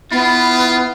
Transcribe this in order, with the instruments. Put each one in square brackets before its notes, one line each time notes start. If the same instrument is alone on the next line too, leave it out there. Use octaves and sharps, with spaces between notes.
[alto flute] B3 [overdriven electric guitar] E4 [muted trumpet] F4